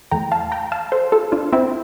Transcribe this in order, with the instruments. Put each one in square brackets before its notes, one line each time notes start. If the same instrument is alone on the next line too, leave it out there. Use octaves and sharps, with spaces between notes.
[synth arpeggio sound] E2 E3 A3 G5 A#5
F5 A5
G5 A#5
F5 A5
A4 C5
F4 A4
D4 F4
C4 E4